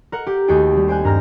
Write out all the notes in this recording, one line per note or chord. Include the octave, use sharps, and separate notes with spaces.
A#4 F#5
G4
D#2 A3 F#4 G#4 G5 A6
G3 C4
C5 G5 G#5 F#6
G2 A#4 A#5 F6 A#6